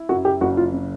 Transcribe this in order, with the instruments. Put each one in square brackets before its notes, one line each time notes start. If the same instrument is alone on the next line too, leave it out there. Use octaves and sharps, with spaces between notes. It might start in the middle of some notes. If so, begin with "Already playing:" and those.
Already playing: [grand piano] E4
[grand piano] F#2 [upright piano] F#4
[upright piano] G4
[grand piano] F#1 [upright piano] F#4
[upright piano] F4
[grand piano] C#3